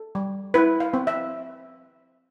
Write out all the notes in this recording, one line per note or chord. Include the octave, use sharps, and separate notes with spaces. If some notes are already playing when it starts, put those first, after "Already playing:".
Already playing: A4
G3
E4 B4
F5
C4
E5